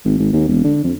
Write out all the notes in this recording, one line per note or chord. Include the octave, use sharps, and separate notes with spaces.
G#1
G#1
D#2
E1
D3
F2